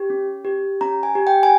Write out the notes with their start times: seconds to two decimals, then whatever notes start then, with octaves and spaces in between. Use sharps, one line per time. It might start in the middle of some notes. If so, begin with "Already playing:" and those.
Already playing: G4
0.10 C#4
0.45 G4
0.81 C#4 A#5
1.03 G#5
1.15 G4
1.27 G5
1.43 G#5